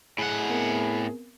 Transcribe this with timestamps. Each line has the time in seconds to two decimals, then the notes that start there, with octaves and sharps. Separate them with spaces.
0.18 A2 G#4 F#5
0.49 B3 C4 A#4